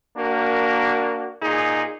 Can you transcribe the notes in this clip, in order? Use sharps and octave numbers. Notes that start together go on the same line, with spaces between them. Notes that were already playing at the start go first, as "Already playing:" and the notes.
A#3 D4 F#4 A#4
A#2 D#4 G#4